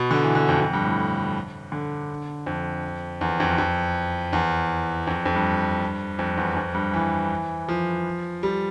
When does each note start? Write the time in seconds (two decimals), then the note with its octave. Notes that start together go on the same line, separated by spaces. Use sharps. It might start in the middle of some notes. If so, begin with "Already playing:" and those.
Already playing: B2
0.11 D3
0.23 E3
0.35 D3
0.49 F2
0.61 F2
0.73 G2
0.85 A2
1.72 D3
2.47 F2
3.21 E2
3.40 F2
3.58 F2
4.33 E2
5.07 F2
5.26 F2
5.35 G2
6.19 F2
6.37 E2
6.57 F2
6.74 G2
6.93 E3
7.68 F3
8.43 G3